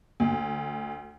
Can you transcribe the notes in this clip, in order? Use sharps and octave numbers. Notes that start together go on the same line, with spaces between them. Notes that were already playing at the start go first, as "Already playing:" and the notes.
D2